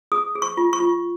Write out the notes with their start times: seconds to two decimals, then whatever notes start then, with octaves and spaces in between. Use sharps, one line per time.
0.12 G#4 D#6
0.35 G#4
0.42 C#6
0.57 F4
0.73 C#6
0.80 F4